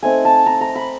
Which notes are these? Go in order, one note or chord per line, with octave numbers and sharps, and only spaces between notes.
A3 C4 D#4 G#5
A5
A#5
A#5
B5